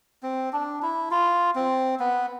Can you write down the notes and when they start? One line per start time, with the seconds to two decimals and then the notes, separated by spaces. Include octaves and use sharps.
0.23 C4
0.53 D4
0.82 E4
1.11 F4
1.55 C4
2.00 B3